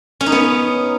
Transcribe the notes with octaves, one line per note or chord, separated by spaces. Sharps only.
C#4
D#4
B3